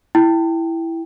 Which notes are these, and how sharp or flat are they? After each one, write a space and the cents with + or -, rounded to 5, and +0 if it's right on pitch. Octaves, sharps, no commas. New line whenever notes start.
E4 +5 G5 +0